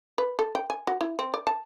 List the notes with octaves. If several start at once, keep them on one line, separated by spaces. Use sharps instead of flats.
B4
A4
G5
G#5
F#4
E4
C4
D5
A5